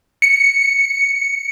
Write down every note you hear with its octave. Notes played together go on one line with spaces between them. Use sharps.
C#7